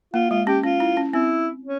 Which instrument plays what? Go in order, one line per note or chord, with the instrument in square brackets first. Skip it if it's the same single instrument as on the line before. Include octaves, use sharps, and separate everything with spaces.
[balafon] A#3 [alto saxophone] F4
[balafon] G#3 [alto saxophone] F4
[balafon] C#4 [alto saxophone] G4
[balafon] C#4 [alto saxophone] F4
[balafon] E4
C#4
[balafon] C4 [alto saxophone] E4
[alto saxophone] C#4